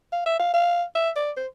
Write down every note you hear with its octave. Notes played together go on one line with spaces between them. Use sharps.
F5
E5
F5
F5
E5
D5
C5